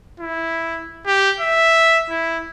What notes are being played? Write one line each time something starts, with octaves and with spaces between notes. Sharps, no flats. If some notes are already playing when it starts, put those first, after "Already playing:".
E4
G4
E5
E4